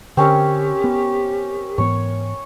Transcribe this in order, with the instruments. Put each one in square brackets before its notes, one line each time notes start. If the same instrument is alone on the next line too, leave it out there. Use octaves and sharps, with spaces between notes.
[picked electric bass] D3 [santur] C4 C#4 A#4 [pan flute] G4
[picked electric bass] B3
[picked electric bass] G#2 E3 B3 [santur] C#5